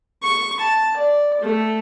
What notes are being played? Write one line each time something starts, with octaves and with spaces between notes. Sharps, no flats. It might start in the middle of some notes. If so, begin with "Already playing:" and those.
C#6
A5
D5
A3